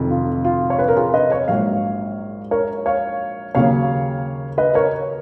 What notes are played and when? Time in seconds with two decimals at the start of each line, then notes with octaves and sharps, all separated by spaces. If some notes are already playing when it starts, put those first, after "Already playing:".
Already playing: F1 F2 D#3 F#3
0.10 F4
0.45 F4
0.70 C#5
0.79 B4
0.88 A#4
0.96 F4 G#4
1.14 B4 D#5
1.30 C#5 F5
1.48 A#1 G#2 F#3 A#3 C#5 F5
2.51 A#4 C#5
2.86 C#5 F5
3.55 D#2 C#3 F#3 A#3 C#5 F5
4.58 B4 D#5
4.75 A#4 C#5